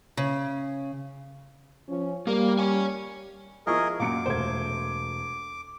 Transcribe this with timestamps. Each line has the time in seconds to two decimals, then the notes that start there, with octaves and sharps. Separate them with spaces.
0.17 C#3
1.88 F3 C#4
2.27 G3 A#3 A#4
2.59 C#5 G#5
3.67 F3 E4 G#4 A#4 D#5 C#6
4.00 F#2 A#2 F4 D6 C#7 D7
4.26 E1 A3 C5 G#6